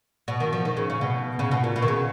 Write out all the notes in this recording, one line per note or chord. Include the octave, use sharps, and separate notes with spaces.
B2
D#3
F3
D#3
C#3
C#3
B2
C#3
B2
A#2
B2
D#3
C#3